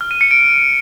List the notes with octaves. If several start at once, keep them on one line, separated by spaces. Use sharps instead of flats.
F6
D#7
C#7
D7